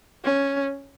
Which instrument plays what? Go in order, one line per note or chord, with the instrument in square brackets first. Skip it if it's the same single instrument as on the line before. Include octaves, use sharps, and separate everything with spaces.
[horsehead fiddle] C#4